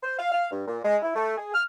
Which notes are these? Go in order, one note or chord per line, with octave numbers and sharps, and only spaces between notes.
C5
F5
F5
G2
A#2
G#3
E4
A3
G#4
F6